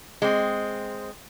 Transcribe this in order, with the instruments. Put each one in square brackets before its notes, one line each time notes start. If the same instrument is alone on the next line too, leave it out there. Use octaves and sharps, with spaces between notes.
[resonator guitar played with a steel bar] G#3 C4